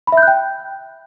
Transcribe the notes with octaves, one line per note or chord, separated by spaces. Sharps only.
B5
E5
G6
F#6
G5